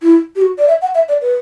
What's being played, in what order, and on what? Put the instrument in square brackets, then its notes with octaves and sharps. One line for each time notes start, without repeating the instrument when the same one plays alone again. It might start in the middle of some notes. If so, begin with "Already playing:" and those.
[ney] E4
G4
F#4
D5
E5
F#5
E5
D5
B4